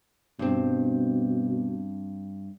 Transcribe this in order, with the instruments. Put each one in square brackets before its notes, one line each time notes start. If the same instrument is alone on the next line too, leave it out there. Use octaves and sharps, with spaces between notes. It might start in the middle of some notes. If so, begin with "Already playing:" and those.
[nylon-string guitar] G2 C4 [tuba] B2